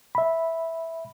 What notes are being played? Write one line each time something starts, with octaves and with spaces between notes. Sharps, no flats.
E5 B5